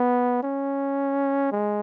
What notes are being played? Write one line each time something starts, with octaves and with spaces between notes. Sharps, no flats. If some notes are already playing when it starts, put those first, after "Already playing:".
Already playing: B3
C#4
G#3